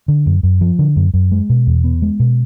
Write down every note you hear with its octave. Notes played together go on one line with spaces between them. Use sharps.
D3
F#2
F#2
F3
D3
F#2
F#2
G#3
B2
E2
B3
G#3
B2